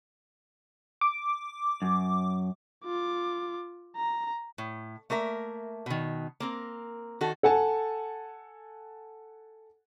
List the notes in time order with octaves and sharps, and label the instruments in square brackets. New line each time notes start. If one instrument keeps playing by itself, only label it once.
[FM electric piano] D6
[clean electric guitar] F#2
[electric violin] F4 D6
A#5
[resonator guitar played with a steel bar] A2
A3 A#3 A#4 E5
B2 D#3
A#3 C4 A#4
D#3 F#4 A4
[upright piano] A4 F#5 G#5 A5